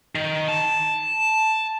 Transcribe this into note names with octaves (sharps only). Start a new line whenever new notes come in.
D#3
A5